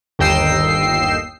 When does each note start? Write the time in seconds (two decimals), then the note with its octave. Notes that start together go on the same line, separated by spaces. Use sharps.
0.19 G1 D#2 D#5 G5 E6 C7